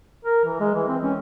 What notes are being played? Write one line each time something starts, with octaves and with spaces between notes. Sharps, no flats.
A#4
E3
G#3
E3
C4
C#4